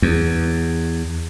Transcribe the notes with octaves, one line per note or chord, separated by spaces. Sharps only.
E2